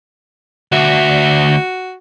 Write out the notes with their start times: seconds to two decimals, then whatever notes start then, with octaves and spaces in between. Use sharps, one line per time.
0.72 D2 F#4 E5